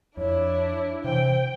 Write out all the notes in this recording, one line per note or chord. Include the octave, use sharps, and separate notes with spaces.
F2 D4 E4 C#5
C3 E3 C5 G5